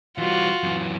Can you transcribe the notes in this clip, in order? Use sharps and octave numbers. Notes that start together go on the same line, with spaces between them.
E3 G3 F4 F#4
F#2 E3